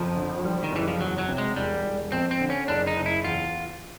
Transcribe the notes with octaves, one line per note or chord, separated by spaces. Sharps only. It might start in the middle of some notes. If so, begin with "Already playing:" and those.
Already playing: F#1 F2 F3
D3
G3
D#3
F#1 E3
F3
E2 F#3
F#3
C3
G#3
E1 G3
E1
F2 C4
C4
D3
C#4
F#1 D4
D#4
F#1
E4
E2 F4